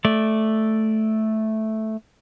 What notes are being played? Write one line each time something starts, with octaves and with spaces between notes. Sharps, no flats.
A3 D5